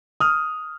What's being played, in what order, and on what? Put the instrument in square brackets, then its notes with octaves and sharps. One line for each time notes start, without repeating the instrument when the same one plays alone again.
[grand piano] D#6 F6